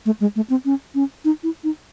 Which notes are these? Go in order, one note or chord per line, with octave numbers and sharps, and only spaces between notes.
A3
G#3
A3
C4
C#4
C#4
D#4
E4
D#4